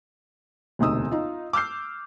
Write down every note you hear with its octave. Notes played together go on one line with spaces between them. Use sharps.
E1 D2 C3 D#4 D#6 E6
D#4 F4
D6 E6 F6 G6 C7